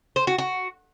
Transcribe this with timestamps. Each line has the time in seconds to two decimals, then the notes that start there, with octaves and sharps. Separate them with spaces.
0.16 C5
0.27 F#4
0.38 F#4